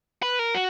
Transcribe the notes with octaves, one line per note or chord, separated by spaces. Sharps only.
B4
A#4
F#4